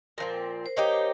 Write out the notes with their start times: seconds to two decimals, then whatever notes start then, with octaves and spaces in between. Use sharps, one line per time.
0.18 A#2 F3 C4 A#4
0.66 C5
0.76 A#3 D#4 G4 C#5